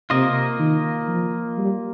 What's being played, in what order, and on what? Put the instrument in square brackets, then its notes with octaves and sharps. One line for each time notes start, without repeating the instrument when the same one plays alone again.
[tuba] C3 [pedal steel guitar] A#3 F4 D#5
[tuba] D#3
F3
G3